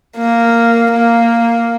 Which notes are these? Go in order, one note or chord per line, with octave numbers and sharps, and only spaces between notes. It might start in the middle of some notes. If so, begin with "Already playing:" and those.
A#3
A#3